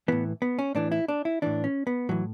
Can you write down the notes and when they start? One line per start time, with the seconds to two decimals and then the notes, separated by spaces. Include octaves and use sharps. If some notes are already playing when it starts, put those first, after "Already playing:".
0.08 A2 E3 B3
0.42 B3
0.59 C#4
0.75 A2 E3 D4
0.92 E4
1.08 D4
1.25 E4
1.42 A2 E3 D4
1.64 C#4
1.87 B3
2.09 A2 E3 F#3